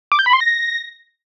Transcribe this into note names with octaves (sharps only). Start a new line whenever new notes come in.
D6
G6
B5
C6
A#6